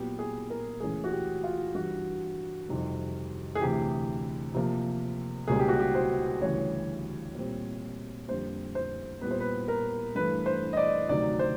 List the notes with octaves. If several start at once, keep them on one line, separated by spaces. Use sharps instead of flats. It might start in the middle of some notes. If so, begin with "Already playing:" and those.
Already playing: A#2 F#3 B3 G4
G#4
A#4
C#2 C#3 E3 A3 C#4 G#4
F#4
G4
F4
G2 E3 G3 F#4
F2 C3 D#3 G3
G#4
D2 C3 E3 G4
C3 F3 A#3
C#2 B2 G3 A#3 C#4 G#4
G4
F#4
G4
C5
D2 C#3 E3 G3 C#5
A#2 G3 C4
F2 D3 G3 A#3 C5
C5
A#2 G3 B3 B4
C5
B4
A#4
G2 E3 A3 B4
C5
D#5
D5
D2 C3 D#3 F#3 D5
C5